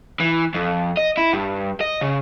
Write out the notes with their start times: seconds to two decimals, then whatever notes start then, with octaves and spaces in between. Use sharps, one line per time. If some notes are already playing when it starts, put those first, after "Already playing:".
0.20 E3
0.54 F2
0.97 D#5
1.17 E4
1.33 G2
1.81 D#5
2.02 C#3